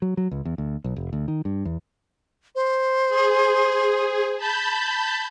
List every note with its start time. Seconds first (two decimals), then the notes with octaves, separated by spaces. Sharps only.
0.02 F#3
0.17 F#3
0.31 C#2
0.45 E2
0.58 D2
0.84 B1
0.96 F1
1.13 D2
1.28 D#3
1.45 G2
1.65 E2
2.55 C5
3.08 G#4
4.37 A5 B5 G6